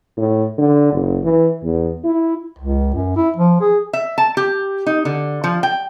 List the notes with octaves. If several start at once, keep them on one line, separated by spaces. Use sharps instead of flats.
A2
D3
F#1
E3
E2
E4
C#2
F#2
E4
F3
G#4
E5
A5
G4
D#4
D3
F3
G5